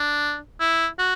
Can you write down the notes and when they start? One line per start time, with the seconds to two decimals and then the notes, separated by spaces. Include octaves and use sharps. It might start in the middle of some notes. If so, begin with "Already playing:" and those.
Already playing: D4
0.60 E4
0.99 F#4